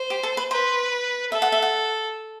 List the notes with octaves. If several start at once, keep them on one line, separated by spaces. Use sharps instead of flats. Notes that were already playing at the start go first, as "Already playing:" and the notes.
Already playing: C5
G4
A4
B4
B4 C5
A4 E5
F#5
E5
F#5